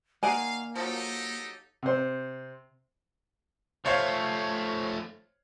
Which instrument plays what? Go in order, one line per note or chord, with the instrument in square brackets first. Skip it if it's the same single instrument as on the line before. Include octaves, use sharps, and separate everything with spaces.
[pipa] D#3 D5 F#5 [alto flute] A#3 [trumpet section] F5 [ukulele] G#5
[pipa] F3 F#3 [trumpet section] D#4 G4 A4
[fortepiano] C3 C5
[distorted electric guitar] F3 A3 [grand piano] C5 C#5 F5